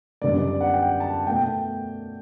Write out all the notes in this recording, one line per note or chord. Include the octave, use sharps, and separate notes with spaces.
F#2 D3 G3 B3 D5
D5
D5
F#5
G5
A5
B2 A3 G5